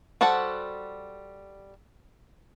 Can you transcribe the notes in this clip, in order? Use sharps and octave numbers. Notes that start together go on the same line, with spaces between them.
G3 F#4 A4 C5 F#5